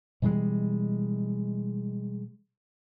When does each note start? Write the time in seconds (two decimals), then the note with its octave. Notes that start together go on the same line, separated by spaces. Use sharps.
0.22 B2 E3 G3 G#3